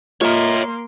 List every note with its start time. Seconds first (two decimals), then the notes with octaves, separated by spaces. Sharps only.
0.21 A#3 F4 A#4 C#5 D#5 E5 C6